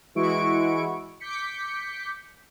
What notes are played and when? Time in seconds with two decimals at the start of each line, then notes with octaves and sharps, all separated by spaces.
0.15 E3 G#3 E4 F#4 C#6 D7
1.20 D6 G6 B6 C#7